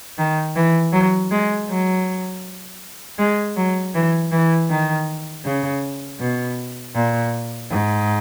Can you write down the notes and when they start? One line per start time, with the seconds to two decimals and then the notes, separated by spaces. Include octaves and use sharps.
0.18 D#3
0.56 E3
0.93 F#3
1.31 G#3
1.68 F#3
3.18 G#3
3.56 F#3
3.94 E3
4.32 E3
4.70 D#3
5.45 C#3
6.19 B2
6.95 A#2
7.70 G#2